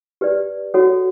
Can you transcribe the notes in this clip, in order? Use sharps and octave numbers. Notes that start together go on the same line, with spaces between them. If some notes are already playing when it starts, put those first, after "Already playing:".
G4 B4 D5
F#4 A4 C#5 F#5